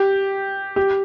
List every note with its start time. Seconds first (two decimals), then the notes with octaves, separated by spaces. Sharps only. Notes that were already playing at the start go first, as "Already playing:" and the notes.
Already playing: G4
0.76 G4